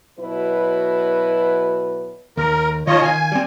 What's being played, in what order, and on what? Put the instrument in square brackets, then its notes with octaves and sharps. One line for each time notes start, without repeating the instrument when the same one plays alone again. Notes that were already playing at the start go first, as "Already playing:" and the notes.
[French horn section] B2 F#3 E4 B4
[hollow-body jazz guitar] D#2 [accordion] A#4
[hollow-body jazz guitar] D#3 A5 [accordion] F4 C#5 D#5
[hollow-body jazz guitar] D#3 F5 [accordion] G#5
[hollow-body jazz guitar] G3 C4